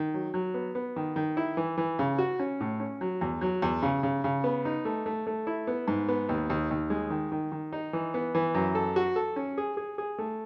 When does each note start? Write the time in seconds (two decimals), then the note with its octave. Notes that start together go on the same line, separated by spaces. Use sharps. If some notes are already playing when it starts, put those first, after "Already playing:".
Already playing: D#3
0.14 F#3
0.34 F#3
0.54 B3
0.75 B3
0.96 D#3
1.16 D#3
1.37 E4
1.57 E3
1.77 E3
1.99 C#3
2.18 F#4
2.39 C#4
2.60 A2
2.80 C#4
3.01 F#3
3.21 E2
3.41 F#3
3.62 E2
3.83 C#3
4.03 C#3
4.24 C#3
4.44 B3
4.65 D#4
4.85 A3
5.06 A3
5.27 A3
5.47 E4
5.67 B3
5.88 G#2
6.08 B3
6.29 D#2
6.50 D#2
6.71 D#2
6.90 G#3
7.10 D#3
7.32 D#3
7.52 D#3
7.73 D#4
7.93 E3
8.14 B3
8.35 E3
8.55 F#2
8.75 A4
8.96 F#4
9.16 A4
9.36 C#4
9.58 G#4
9.77 G#4
9.98 G#4
10.18 A3